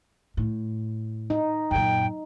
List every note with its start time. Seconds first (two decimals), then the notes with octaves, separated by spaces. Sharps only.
0.37 A2
1.30 D#4
1.71 F#2 A#2 G5